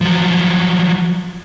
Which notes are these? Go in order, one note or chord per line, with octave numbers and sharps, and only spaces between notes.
F3 F#3